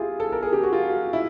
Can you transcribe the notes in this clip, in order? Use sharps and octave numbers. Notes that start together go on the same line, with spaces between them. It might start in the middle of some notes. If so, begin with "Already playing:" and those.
Already playing: E4 F4 G4 G#4
A4
A#4
G#4
G4
F#4
F4
E4